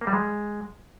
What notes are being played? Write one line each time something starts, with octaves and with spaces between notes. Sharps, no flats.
A#3
G3
G#3